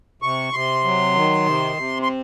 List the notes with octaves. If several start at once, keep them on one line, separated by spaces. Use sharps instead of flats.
C3 C#6
C3 C6
F#3
D#3
C3
C3
C6